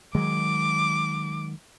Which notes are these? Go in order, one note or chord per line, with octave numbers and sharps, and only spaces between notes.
D#3 F#3 G#3 D6